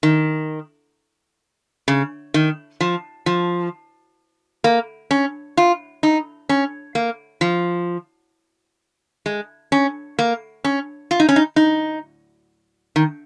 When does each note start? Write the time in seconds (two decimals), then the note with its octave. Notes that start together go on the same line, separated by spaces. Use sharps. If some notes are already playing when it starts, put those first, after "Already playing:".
0.03 D#3
1.88 C#3
2.34 D#3
2.81 F3
3.26 F3
4.64 A#3
5.11 C#4
5.57 F4
6.03 D#4
6.49 C#4
6.95 A#3
7.41 F3
9.26 G#3
9.72 C#4
10.19 A#3
10.64 C#4
11.11 F4
11.20 D#4
11.29 C#4
11.36 D#4
11.56 D#4
12.96 D#3